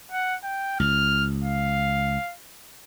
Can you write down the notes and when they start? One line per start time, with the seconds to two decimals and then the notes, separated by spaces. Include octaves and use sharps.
0.11 F#5
0.43 G5
0.80 C#2 F6
1.44 F5